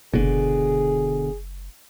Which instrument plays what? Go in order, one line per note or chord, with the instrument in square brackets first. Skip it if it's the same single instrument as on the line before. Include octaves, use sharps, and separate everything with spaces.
[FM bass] F#1 [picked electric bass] B2 D3 [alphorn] G#4